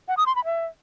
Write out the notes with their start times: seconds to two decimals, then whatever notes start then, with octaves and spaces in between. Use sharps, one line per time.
0.08 F#5
0.17 D#6
0.26 C6
0.36 B5
0.45 E5